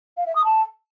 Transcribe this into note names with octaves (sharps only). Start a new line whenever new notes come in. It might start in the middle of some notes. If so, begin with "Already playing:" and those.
F5
E5
D#6
A5